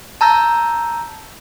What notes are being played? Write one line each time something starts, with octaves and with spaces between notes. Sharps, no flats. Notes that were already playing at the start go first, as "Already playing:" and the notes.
A5 A#5 E6 G6 A#6